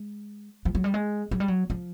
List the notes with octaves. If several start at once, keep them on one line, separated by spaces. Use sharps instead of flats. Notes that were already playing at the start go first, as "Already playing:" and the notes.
Already playing: G#3
F3
F#3
G3
G#3
F#3
G3
F#3
F3